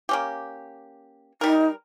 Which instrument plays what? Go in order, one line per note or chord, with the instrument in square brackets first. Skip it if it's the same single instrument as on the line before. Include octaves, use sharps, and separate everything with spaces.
[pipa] A#3 C#4 G4
[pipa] G3 A#4 [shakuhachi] D#4